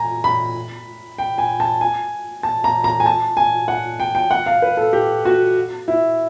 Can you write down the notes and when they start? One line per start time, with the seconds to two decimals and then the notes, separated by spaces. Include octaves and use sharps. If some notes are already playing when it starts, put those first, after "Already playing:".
Already playing: G#5 A#5
0.24 B5
1.18 G5
1.38 G#5
1.60 A5
1.81 G#5
2.43 A5
2.64 A#5
2.84 A#5
3.00 G#5
3.06 A5
3.37 G#5
3.68 F#5
4.00 G5
4.15 G5
4.31 F#5
4.46 F5
4.62 B4
4.77 A4
4.93 G4
5.25 F#4
5.88 E4